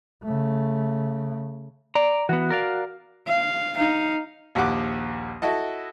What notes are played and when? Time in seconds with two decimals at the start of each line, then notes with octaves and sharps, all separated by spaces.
0.25 C#3 A3
1.95 D5 A#5
2.29 E3 B3 F#4
2.50 A#4 D5 F5
3.27 F5
3.76 D#4 F5
4.55 A#1 D#2 G4 F#5 D6
5.42 E4 F#4 A4 D#5